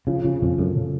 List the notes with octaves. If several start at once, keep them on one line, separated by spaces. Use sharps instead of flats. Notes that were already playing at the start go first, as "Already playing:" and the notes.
C#3 F3
C#3 F3
F2 C#3
F#2 A3
C#3